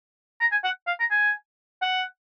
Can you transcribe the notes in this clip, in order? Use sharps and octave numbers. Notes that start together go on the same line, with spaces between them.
A#5
G#5
F#5
F5
A#5
G#5
F#5